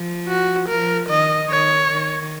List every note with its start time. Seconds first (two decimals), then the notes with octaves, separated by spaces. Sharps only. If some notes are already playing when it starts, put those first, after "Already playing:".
Already playing: F3
0.28 F#4
0.68 F3 A#4
1.09 D#3 D#5
1.50 D#3 C#5
1.91 D#3